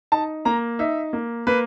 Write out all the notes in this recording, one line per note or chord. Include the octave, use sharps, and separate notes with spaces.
D#4 A5
A#3 A#5
D#4 E5
A#3
A#3 B4